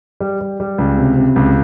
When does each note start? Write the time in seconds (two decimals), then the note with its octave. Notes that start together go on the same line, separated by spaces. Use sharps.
0.21 G3
0.41 G3
0.60 G3
0.78 C#2
0.98 C3
1.16 C3
1.36 C#2